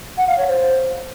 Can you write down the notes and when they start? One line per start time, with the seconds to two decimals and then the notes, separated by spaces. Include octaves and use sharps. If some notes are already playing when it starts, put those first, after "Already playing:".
0.18 F#5
0.28 F5
0.38 C#5
0.48 C5